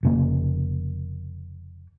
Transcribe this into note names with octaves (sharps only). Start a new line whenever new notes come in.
F1 C#3 A#3